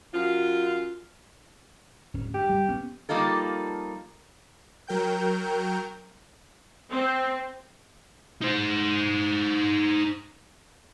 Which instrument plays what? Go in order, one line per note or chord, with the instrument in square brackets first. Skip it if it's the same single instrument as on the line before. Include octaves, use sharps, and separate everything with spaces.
[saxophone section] F#2 F4
[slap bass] D1 C#4
[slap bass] G2 [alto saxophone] G4
[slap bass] G3
B3 C#4
[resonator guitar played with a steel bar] F3 G3 A#3 D#4 F4 A4
[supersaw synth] F#3 A#4 G5 G6
[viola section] C4
[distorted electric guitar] D#4 C5